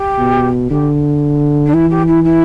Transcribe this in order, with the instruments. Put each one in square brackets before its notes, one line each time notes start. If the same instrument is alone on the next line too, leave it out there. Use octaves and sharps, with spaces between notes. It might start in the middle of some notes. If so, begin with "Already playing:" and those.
Already playing: [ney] G4
[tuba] B2
[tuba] D3 [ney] G4
[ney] D4
[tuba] E3 [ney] E4
[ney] G4
E4
E4